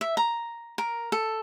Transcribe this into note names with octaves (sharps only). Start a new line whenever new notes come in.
E5
A#5
A#4
A4